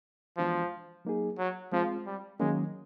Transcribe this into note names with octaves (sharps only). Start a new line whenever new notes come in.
E3 F3 G#3 B3 D4 F#4
F#3 A#3 D#4 G#4
F#3
F3 G#3 C4 F4
G3
D#3 F#3 G#3 A#3 C#4